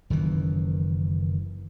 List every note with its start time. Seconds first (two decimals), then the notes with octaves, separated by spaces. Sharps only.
0.10 F#1 D#3 E3